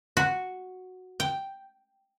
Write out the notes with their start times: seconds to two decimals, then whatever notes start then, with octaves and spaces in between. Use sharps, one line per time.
0.17 F#4
1.20 G5